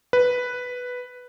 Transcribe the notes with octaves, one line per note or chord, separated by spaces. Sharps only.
B4